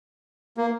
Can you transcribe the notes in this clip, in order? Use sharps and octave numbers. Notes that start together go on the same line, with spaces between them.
A#3